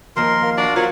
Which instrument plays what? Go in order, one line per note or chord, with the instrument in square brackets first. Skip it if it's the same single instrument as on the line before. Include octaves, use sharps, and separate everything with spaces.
[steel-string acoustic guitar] D#2 F3 [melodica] A#4 C6
[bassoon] A#3
[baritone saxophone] D4 [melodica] F#4
[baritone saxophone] F#3 [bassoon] A#3 [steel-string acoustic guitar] F4 C5